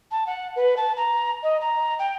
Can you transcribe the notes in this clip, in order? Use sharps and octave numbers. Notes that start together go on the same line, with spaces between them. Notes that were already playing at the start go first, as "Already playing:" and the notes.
A5
F#5
B4
A5
A#5
D#5
A#5
G5